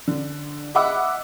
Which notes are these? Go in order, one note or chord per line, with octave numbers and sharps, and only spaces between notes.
D3
D#5 E5 F#5 B5 D6 E6